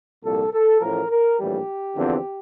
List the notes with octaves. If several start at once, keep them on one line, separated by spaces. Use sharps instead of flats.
C2 A#2 F3 A4
A4
A1 A2 F3 A#4
A#4
A#1 A2 E3 G3 G4
E2 D3 F3 C4